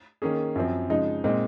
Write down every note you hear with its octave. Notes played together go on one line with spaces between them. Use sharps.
D#3 A#3 C#4 G#4
F#2 F3 C4
C#3 F3 G#3 D#4
A#2 G#3 C4 D#4